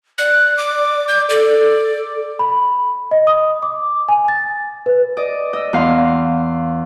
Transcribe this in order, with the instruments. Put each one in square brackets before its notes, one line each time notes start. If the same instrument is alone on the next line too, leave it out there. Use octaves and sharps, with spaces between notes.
[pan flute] D5 [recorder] F#6
[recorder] D6
G6
[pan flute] A4 [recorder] D5
[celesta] B5
D#5
D#6
D6
G#5
A6
B4
[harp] D5 D#5
D#5 E6
E2 F5 C6